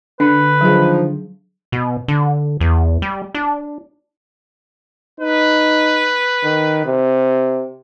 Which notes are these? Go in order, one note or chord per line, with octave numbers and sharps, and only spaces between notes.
D3 D4 B4
D#3 F3 F#3 G#4
B2
D3
E2
G3
D4
D#4 B4
D#3
C3